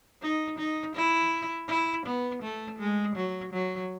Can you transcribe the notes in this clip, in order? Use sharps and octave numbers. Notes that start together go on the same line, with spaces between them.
D#4
D#4
E4
E4
B3
A3
G#3
F#3
F#3